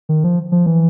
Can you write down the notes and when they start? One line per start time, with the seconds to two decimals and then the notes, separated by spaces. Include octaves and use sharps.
0.09 D#3
0.24 F3
0.52 F3
0.66 E3